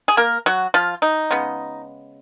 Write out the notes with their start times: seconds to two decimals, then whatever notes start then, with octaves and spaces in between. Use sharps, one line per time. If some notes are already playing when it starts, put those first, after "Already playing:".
0.08 G#4
0.17 A#3 A#4
0.46 F#3 F#4
0.74 F3 F4
1.02 D#4
1.31 C#3 G#3 B3